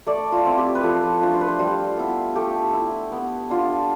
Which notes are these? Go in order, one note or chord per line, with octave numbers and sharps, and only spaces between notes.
A3 D5
F4
C4 E4
G4
B4
F3 A4
A3 D4 F4
C5
B4
C5
G3 F4
B3 E4
A3 G4
E4
B3
D4 F4